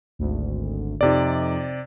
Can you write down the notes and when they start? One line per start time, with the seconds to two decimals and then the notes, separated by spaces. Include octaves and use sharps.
0.19 G#1 D2
1.01 F2 C3 D#4 D5